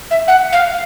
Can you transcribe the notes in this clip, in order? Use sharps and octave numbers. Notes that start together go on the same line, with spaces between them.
E5
F#5
F5